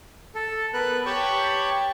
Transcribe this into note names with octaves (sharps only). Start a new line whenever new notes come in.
A4
B3 A#4 B4 F#6
G4 C#5 G5 A5 B5 C#6